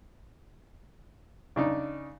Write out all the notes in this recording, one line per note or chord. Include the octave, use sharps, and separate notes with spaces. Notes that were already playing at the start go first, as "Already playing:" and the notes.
C#3 D4 D#4